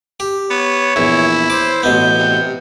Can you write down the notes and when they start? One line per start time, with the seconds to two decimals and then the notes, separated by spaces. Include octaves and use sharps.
0.20 G4
0.50 B3 C#5
0.96 A#1 E2 E4
1.50 C5 D6
1.83 A1 B2 B3 G6
2.19 C3